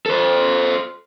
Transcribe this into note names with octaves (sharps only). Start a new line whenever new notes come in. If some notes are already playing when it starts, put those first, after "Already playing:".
A4 C5